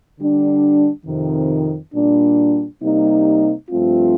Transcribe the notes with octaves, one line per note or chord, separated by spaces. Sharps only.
D3 G3 D4
F2 C3 D#3
A#2 G3 D4
C3 G3 A#3 D#4
G2 F3 A3 C4 F4